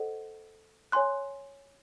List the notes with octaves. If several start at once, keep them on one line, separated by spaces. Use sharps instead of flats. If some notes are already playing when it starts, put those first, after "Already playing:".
Already playing: A4 C5 D#5 F#5
C#5 G#5 C6 F#6